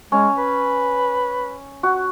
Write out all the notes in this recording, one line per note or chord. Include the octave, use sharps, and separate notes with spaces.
G#3 C#4
B4
F#4